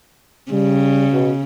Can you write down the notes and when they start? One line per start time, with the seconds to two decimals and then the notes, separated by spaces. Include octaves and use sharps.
0.51 C#3 G3
1.11 B2